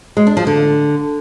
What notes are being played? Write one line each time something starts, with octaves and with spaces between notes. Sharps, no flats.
G#3
D4
F3
D3